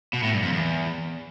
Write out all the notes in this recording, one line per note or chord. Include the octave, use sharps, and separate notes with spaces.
B2
A2
G2
F2
E2